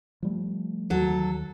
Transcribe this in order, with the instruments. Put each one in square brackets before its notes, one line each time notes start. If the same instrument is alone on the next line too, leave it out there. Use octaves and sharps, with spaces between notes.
[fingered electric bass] F3 G3 A3
[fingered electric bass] D#2 D#3 [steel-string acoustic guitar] F#3 A4